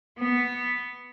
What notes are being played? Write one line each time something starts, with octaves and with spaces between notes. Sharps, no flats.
B3